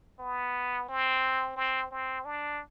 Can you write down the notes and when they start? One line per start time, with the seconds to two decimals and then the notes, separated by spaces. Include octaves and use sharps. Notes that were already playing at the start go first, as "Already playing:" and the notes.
0.19 B3
0.88 C4
1.56 C4
1.91 C4
2.25 D4